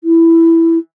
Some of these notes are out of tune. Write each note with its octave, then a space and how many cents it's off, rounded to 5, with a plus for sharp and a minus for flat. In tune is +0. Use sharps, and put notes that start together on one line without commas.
E4 +5